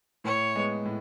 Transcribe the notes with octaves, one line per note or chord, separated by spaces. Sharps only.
A2 C#5
G#3 B3
A2